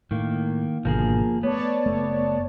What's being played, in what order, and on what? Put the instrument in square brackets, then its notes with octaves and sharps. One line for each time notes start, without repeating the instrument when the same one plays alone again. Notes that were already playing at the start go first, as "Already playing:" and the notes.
[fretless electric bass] A2 [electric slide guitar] D#3 A#3
[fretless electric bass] G#1 B2 D3 [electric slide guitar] F3 A#3 G#4
[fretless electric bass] A3 [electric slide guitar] B3 [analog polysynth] C#5 D5 A5
[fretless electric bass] F#1 A3